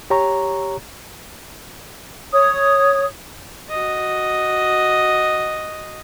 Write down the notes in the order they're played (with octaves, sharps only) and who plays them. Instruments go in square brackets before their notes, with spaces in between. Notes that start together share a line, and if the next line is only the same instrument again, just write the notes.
[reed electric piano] G4 C#5 A#5 C#6
[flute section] C#5 D#6
[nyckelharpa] F#4 D#5